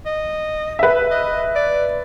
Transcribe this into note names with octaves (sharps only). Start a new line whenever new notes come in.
D#5
B4 E5
D#5
D5